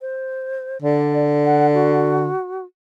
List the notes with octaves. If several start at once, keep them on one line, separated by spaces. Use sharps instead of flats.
C5
D3 D5
F#5
F#4